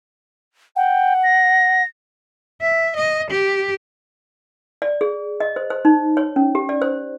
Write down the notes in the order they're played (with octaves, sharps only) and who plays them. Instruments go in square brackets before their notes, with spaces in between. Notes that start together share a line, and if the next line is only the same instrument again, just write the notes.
[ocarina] F#5 [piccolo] G5
[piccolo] A#6
[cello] E5
D#5
G4
[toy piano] D5
G#4
D#5
C5
C5
D#4
C#5
C#4
G4
D5
C5